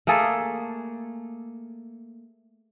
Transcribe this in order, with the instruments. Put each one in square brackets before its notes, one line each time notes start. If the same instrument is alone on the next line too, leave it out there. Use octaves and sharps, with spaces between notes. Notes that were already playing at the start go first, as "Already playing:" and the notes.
[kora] A3 A#3 G#4 A4